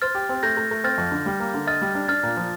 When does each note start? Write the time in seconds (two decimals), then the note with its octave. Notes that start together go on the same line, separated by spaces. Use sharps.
0.02 C5 F6 A6
0.15 G4
0.29 C4
0.43 A3 G6 A#6
0.57 A3
0.71 A3
0.84 C4 F6 A6
0.98 F2
1.11 D3
1.26 G3
1.40 A#3
1.54 D3
1.67 D#5 F6 A6
1.81 G3
1.95 D4
2.08 D4 F6 A6
2.23 A#2
2.37 F3